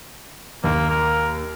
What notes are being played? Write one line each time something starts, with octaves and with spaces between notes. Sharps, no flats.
D#2 A#3
A#4